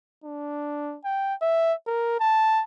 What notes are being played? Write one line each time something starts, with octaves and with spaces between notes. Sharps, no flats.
D4
G5
E5
A#4
A5